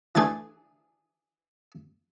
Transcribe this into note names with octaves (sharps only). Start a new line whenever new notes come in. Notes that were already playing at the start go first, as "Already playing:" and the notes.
E3 A3 D4 G#4 G#6 A6